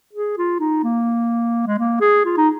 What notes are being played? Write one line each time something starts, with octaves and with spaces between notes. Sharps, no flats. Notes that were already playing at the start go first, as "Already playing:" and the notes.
G#4
F4
D#4
A#3
G#3
A#3
G#4
F4
D#4